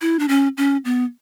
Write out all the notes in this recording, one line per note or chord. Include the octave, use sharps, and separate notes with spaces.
E4
D4
C#4
C#4
B3